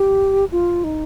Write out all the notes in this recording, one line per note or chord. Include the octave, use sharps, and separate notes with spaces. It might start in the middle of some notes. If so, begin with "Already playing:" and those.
Already playing: G4
F4
D#4